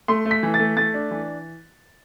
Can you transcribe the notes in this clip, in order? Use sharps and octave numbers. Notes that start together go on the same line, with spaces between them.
A3 C6
A3
B6
E3
A6
A3
A3 A6
D4
E3